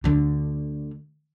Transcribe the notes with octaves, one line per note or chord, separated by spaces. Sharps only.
D2 D3